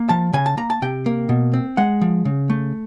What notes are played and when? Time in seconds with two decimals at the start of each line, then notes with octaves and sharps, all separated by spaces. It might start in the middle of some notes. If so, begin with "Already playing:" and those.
Already playing: A#3
0.09 F3 A5
0.33 C#3 G#5
0.46 A5
0.57 A#3 A#5
0.70 A5
0.82 C3 G5
1.06 A#3
1.29 B2
1.54 C4
1.77 G#3 F#5
2.01 F3
2.25 C#3
2.50 A3